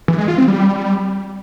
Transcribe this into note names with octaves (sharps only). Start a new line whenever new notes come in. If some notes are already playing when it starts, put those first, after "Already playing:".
E3
G#3
F4
C4
G3